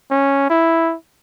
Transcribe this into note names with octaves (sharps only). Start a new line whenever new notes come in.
C#4
E4